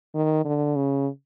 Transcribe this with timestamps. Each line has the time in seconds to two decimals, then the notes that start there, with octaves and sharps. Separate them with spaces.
0.15 D#3
0.45 D3
0.76 C#3